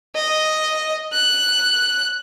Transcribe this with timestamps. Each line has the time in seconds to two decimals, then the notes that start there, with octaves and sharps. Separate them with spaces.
0.15 D#5
1.13 F#6